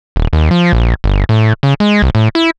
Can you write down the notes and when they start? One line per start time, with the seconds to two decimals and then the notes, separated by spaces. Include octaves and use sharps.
0.16 D#1
0.33 D#2
0.51 F3
0.73 A#1
1.04 G1
1.29 A2
1.63 C#3
1.80 G#3
2.02 C2
2.15 A2
2.35 E4